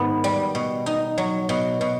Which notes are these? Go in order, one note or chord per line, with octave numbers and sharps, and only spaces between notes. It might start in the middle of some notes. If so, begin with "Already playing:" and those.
Already playing: G#2 D#3 B3
G3
B2
D#4
F#3
B2
B2